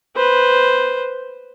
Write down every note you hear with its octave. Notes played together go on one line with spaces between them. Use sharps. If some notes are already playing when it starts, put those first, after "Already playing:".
B4 C5